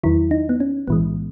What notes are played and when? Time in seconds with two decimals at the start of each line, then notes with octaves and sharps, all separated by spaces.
0.03 E2 D#3 F#3 E4
0.31 D#4
0.49 B3
0.60 C#4
0.88 B1 A2 E3 G#3 B3